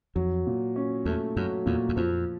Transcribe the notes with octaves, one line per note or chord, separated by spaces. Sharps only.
F2 F#3
A#2
C#4
E2 A3
F#2 F#3
E2 A#2
E2
F2 F3